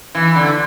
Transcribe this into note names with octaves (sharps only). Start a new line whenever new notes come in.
E3
D3